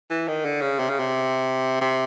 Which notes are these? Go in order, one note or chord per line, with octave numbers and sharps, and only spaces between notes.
E3
D#3
D3
C#3
C3
C#3
C3
C3